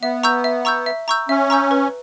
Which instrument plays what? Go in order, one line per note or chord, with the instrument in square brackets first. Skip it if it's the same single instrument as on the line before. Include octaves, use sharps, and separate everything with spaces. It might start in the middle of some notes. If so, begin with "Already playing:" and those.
[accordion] B3 [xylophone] E5
[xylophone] A#5 C#6 E6 G6
E5
A#5 C#6 E6 G6
E5
A#5 C#6 E6 G6
[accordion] C#4 [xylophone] E5
[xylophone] A#5 C#6 E6 G6
B4